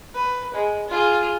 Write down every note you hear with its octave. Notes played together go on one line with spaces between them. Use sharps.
B4
G#3
F4 G#4